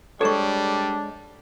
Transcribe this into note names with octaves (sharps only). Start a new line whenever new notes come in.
G3 G#3 D4 A4 C5 C#5 C#6